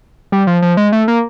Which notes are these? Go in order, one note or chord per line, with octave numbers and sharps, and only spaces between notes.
G3
F3
F3
G#3
A3
A#3